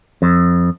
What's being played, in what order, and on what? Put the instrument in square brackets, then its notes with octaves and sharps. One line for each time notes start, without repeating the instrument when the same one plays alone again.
[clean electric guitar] F2